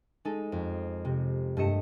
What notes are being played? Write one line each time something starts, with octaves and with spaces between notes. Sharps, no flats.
G#3 D#4 A4
F2
C3
G2 A3 A#3 D#5 C#7 E7